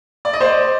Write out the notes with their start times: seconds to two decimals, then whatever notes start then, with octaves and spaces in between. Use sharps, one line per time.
0.25 D5
0.33 D#5
0.40 C5 D5